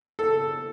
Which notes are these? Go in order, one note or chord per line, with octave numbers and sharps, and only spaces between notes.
A4